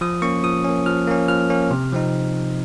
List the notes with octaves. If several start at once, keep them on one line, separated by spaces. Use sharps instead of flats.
F3 D#6
A#3 C#4 C#6
F3 D#6
A#3 C#4
F3 F6
A#3 C#4
F3 F6
A#3 C#4
C3
F3 C4 D#4